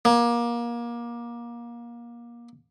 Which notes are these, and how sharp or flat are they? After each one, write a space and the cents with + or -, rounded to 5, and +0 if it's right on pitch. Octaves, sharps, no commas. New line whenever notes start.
A#3 +25